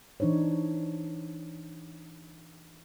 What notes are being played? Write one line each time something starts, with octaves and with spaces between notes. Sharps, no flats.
E3 D4 D#4 C5 C#5